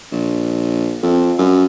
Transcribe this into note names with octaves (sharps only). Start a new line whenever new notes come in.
A#1
F2
F#2